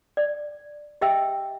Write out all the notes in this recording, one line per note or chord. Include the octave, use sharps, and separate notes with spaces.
D5
G4 D#5 E5 G5 E6